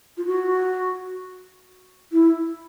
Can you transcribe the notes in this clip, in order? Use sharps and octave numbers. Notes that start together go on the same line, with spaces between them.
F4
F#4
E4